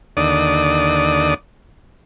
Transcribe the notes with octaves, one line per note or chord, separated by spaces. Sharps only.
D#2 D3 D5 D#6